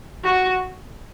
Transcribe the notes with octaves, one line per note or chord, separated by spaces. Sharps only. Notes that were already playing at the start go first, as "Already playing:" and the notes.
F#4